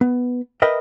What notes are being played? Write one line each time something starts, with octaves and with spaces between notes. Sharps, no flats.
B3
A#4 B4 D#5 E5 G5